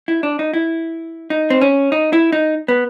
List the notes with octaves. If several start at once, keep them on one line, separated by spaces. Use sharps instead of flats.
E4
D4
D#4
E4
D#4
C4
C#4
D#4
E4
D#4
B3